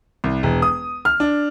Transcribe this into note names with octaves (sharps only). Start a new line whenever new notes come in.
C2
E1
D#6
F6
D4